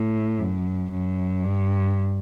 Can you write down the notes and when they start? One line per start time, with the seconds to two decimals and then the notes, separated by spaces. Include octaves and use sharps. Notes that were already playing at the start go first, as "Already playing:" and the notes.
Already playing: A2
0.39 F#2
0.91 F#2
1.44 G2